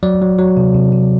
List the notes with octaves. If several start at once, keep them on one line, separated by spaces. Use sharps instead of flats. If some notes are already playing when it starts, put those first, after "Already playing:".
F#3 D5
F#3
F#3
C3
C3
C3